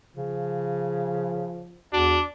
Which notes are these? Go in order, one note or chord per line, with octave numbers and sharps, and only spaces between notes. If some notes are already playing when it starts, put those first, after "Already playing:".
C#3 F3
E2 D4 F#4